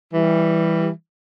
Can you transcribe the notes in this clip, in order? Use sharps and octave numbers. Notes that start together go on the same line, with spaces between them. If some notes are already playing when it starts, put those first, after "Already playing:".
E3 G3